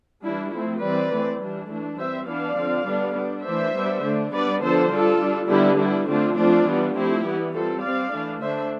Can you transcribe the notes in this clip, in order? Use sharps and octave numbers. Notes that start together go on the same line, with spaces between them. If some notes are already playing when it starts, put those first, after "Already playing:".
E3 G3 D4 E4
F3 A3 C4 E4
E3 G3 C4 B4 D5
E3 A3 C4
E3 G3 D4
E3 A3 D4
G3 C4 C5 E5
E3 B3 D4 D5 F5
D3 F3 C4
D3 G3 B3 D4
G3 D4
E3 A3 D4 C5 E5
G3 B3 D4
D3 A3 D4
G3 B3 D4 B4 D5
D3 F3 B3 D4 A4 C5
G3 D4 F4 A4
G3 D4
D3 G3 B3 D4 E4 G4
G3 B3 D4 E4
D3 A3 C4 D4 F4
F3 A3 C4 D4 F4
E3 G3 B3
F3 A3 C4 E4 G4
E3 G3 B3
G3 C4 F4 A4
G3 C4 D5 F5
E3 A3 D4
D3 A3 D4 C5 E5